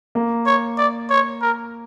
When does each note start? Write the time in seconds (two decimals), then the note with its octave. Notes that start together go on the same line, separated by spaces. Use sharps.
0.15 A#3
0.46 C#5
0.78 D5
1.10 C#5
1.42 A#4